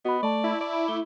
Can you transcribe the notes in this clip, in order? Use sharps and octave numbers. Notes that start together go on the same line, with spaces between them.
B3 F#4 D#5 B5
A3 D5 A5 C#6
E4
D5 D6
A3 G7